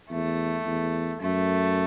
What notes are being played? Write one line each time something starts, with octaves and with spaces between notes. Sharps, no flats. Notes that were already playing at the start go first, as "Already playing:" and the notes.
E2 A3
E2
F#2 A3